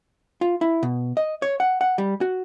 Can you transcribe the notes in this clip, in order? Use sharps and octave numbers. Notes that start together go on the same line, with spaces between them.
F4
E4
B2
D#5
C#5
F#5
F#5
G3
F#4